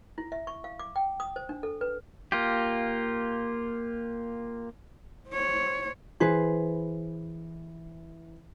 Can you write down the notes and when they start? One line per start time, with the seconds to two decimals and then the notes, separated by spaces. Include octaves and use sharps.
0.18 E4
0.32 E5
0.47 C#6
0.64 F5
0.79 D6
0.96 G5
1.20 D#6
1.36 C5
1.49 D4
1.63 A4
1.81 B4
2.32 A#3 F4 G4
5.29 C5 C#5
6.20 E3 G#4 B4 C5